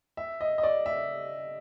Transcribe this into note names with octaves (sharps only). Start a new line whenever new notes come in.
E5
D#5
D#5
D5
E5